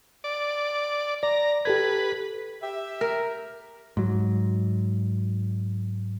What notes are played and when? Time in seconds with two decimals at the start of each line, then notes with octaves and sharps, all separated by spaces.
0.24 D5
1.23 D5 A#5
1.65 G4 A4 B4 G#6
2.62 G4 E5
3.01 A#4
3.97 G#2 F#3